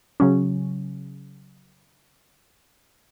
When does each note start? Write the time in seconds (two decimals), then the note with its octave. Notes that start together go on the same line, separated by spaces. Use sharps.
0.20 C#3 F#3 C#4